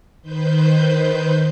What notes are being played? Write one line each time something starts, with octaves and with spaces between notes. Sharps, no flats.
D#3 B4 C5 G6